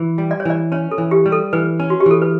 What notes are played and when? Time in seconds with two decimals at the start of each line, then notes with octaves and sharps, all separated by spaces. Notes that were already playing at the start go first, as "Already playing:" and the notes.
Already playing: E3
0.18 G3
0.31 D5
0.40 C#5
0.45 E3 D5
0.72 C#4 C#5
0.91 A4
0.98 E3
1.11 G4
1.26 G3
1.32 A4
1.53 E3 B4
1.80 C#4
1.90 F#4
2.00 G4
2.06 E3 A4
2.22 B4